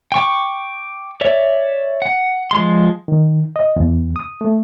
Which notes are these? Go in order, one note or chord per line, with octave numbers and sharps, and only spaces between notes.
G5 C#6 D6
C#5 D5 E5
F#5
F3 G#3 C6
D#3
D#5
E2
D#6
A3